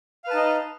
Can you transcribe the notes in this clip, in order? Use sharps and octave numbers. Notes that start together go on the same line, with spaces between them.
D#4 B4 D#5 F5 A5